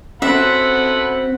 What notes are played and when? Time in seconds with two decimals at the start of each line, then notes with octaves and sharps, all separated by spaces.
0.22 C4 C#4 F#4 A4 E5 F#5 B5